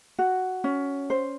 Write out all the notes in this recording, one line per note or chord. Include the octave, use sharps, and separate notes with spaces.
F#4
C#4
C5